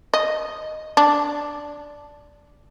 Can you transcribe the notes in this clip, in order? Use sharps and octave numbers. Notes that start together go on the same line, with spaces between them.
D#5
D4